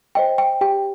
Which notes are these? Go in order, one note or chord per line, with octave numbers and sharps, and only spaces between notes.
C5 D#5 G5
G5
G4 G5